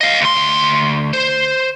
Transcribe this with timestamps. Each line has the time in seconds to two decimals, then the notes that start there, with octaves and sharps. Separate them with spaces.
0.01 D#5 F5
0.21 D2 C6
1.13 C5